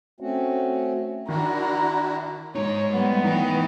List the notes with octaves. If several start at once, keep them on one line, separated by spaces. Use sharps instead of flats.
A3 C4 C#4 F#4
D#3 D4 E4 F#4 A#5
G#3 D#4 C#5
G3 A3 B3
E3 D#4 G5